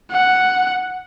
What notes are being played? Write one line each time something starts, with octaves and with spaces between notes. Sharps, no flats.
F#5